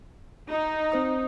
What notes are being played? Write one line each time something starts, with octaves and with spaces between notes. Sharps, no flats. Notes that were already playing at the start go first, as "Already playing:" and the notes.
D#4
C4 C5 D#6